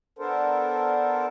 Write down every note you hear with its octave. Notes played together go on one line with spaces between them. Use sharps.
B3 D4 A4 A#4 C5